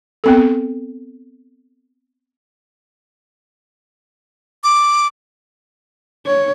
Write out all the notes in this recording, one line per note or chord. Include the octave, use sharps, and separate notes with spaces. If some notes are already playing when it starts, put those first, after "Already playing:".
B3 C4 A4
D6
C#5